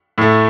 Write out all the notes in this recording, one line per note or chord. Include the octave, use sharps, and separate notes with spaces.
A2 A3